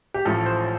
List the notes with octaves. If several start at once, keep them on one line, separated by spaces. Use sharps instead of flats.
G4
A1 A2 F3 A4
C5